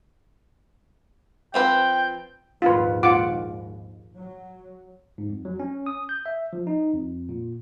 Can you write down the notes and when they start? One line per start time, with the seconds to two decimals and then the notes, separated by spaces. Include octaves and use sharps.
1.54 F3 C4 B4 G5
2.62 A#1 D#2 G#2 F4 B4
3.03 F4 F#5 D6
4.18 F#3
5.18 G#2
5.30 F2
5.45 F#3
5.60 C#4
5.86 D#6
6.09 G6
6.26 E5
6.53 F3
6.67 D#4
6.93 F2
7.29 A#2